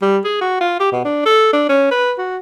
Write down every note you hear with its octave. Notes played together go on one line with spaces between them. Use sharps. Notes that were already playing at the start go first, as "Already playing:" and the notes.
G3
G#4
F#4
F4
G4
B2
D4
A4
D4
C#4
B4
F#4